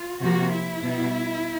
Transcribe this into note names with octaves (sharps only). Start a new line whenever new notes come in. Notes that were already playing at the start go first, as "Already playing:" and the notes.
Already playing: F4
C3 F3 A#3 F#4
E4
B2 G3 B3